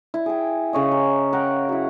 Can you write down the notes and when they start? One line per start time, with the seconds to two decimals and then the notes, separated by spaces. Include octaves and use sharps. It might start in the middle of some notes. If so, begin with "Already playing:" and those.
0.14 E4
0.26 G#4 G5
0.73 C#3 C#5 D#5
0.92 A#4
1.33 A#4 F#5 G5
1.69 F#3 E4